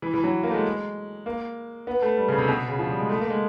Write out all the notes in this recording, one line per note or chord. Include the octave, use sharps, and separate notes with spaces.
E3
E3
F#3
A#3
A3
G#3
A#3
B3
A3
G3
C#3
C3
B2
C#3
F3
G3
G#3
A3
A#3
G#3